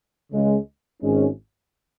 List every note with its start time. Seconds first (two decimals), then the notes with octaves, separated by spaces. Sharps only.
0.32 C#2 C#3 G#3
1.02 G#1 G#2 G#3 C#4